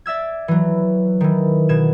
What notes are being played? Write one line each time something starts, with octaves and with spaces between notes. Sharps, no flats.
D5 E5 E6 G#6
E3 F#3
D#3 E3
B2 G#6 E7